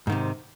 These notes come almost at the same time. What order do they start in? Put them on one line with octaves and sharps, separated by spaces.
G#2 D#3 C3